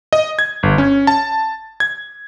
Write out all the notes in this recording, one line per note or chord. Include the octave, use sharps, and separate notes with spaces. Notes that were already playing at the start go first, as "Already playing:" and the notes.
D#5
G#6
G1
C#4
A5
G#6